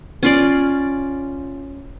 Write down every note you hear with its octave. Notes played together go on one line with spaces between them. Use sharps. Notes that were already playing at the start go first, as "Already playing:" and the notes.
C#4 F4 D5